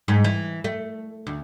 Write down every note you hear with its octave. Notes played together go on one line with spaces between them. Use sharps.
G#2
E3
A3
D2